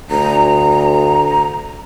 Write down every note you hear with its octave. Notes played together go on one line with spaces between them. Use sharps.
D2 A#5